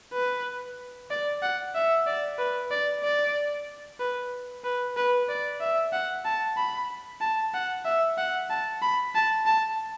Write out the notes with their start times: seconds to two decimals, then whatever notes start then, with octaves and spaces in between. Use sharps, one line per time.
0.14 B4
1.11 D5
1.42 F#5
1.75 E5
2.07 D5
2.38 B4
2.71 D5
3.04 D5
4.00 B4
4.64 B4
4.97 B4
5.29 D5
5.61 E5
5.93 F#5
6.25 A5
6.57 B5
7.21 A5
7.54 F#5
7.85 E5
8.18 F#5
8.50 A5
8.82 B5
9.15 A5
9.46 A5